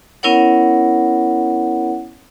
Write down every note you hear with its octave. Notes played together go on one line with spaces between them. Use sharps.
B3 C#4 E4 A#4 C#5 F#5